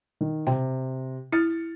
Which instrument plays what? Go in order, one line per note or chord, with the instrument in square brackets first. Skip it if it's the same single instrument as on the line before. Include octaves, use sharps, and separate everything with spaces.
[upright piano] D#3
[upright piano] C3 [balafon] G5
[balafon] E4 [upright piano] F6 A6 C#7